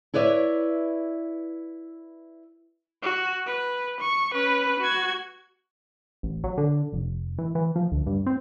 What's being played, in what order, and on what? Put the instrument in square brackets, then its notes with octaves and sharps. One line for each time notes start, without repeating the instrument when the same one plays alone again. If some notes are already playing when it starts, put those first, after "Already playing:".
[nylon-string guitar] E4 B4 C#5 D5 E5
[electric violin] F#4
B4
C#6
C#4 B4
F#4 G#6
[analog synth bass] A1
F#3
D3
F1
E3
E3
F3
D2
G2
C4